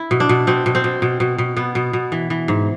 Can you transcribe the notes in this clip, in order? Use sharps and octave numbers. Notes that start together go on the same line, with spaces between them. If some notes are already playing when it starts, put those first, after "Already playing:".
Already playing: E4
B2
D4
B2
B2 C4
B2
C4
B2
B2
B2
B2
B2 B3
B2
B2
E3
E3
G#2